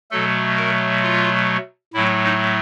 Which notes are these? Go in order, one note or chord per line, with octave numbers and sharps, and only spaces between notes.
B2 F#3 A3 A4
A#4
F4
A2 F#3 A3 E4
D#4